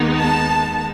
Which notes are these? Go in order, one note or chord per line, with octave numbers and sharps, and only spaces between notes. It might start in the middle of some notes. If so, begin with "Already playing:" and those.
Already playing: D#2 D#3 G#3 B3 D#4
A5